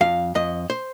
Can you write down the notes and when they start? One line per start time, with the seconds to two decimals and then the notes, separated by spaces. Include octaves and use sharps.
0.01 F2 F5
0.35 F2 D#5
0.70 C5